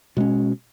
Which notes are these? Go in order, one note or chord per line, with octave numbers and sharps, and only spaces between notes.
B2 G#3 C#4